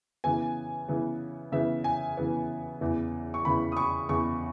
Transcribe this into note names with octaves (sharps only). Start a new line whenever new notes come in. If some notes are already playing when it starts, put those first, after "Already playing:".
C#3 E3 B3 G#5
C#3 E3 B3
C#3 E3 B3 E5
G#5
C#3 E3 B3
E2 C#3 E3
C#6
E2 C#3 E3 B5
D#6
C#6
E2 C#3 E3 C#6